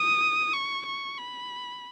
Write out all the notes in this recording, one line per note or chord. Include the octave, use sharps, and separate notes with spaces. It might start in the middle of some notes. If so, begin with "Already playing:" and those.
Already playing: D#6
C#6
C#6
B5